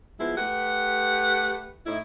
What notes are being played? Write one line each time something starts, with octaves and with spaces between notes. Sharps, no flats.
F3 G#3 B3 E4
A3 G4 B4 F#5
A2 D#4 E4